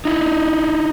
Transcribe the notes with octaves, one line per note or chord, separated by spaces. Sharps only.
D#4 E4